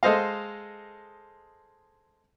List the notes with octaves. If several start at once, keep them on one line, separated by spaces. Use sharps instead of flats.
G#3 A4 C5 D#5 F5